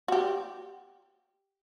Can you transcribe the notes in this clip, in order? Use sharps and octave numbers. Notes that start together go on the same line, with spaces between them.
F#4 G4